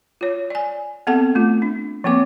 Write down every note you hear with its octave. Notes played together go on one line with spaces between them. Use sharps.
F4 C#5
D5 G#5
B3 C4 A4 F#5 A5
A3 F4
D4
F3 A#3 C4 D6